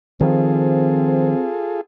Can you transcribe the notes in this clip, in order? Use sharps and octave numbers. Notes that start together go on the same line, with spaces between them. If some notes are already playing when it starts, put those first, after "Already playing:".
D#3 F3 C4 F4 G#4 A4